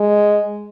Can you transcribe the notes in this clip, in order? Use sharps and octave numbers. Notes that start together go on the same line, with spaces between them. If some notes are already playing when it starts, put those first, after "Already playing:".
Already playing: G#3